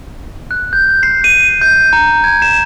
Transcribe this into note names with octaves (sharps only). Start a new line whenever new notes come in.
F#6
G6
C7
D#7
G6
A#5
G#6
E7